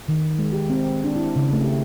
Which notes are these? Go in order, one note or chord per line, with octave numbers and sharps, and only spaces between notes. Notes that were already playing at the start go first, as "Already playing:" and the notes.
D#3
G#3
G4
C4
D4
E4
C#3
A3
G4